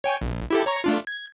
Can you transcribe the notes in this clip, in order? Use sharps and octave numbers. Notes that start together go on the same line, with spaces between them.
C#5 G5 G#5
A#1
E4 G4 A4
C#5 A#5 C#6
A3 D4 F4
G#6